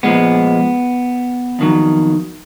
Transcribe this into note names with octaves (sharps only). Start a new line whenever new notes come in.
A#2 F3 G#3 B3
F2 D#3 F#3